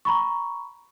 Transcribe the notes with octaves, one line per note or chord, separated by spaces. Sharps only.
A#5 B5 C#6